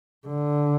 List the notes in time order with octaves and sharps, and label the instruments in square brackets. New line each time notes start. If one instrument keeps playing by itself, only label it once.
[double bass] D3